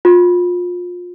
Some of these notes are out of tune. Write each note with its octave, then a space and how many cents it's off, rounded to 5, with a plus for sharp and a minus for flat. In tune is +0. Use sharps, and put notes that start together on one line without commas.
F4 +25